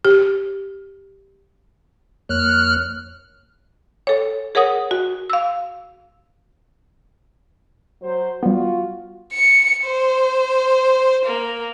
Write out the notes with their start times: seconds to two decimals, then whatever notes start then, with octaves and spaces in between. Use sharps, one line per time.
0.05 G4
2.29 F2 A#3 C#5 F6 F#6
4.07 A4 C#5
4.55 G#4 A#4 C#5 F#5 D#6
4.91 F#4
5.30 F5 E6
8.02 F#3 C5
8.43 G3 B3 F4 F#4
9.33 C#7
9.85 C5
11.25 A#3